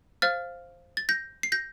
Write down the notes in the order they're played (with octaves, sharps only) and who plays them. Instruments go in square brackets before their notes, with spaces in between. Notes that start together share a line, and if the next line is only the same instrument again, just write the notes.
[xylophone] C5 F5 F6 A6
A6
G6 A#6
C7
G6 A#6